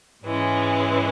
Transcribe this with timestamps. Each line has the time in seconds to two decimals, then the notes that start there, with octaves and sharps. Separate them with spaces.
0.24 G#2 E3 G#3 C#4